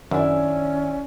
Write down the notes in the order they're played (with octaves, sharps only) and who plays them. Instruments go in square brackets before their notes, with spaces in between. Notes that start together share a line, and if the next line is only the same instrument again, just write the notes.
[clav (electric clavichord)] F#2 [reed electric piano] D#3 E5 E6 [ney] C#4 [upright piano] D4 E4